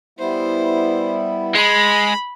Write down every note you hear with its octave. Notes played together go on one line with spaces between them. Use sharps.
G3 B3 E4 C5
G#3 B5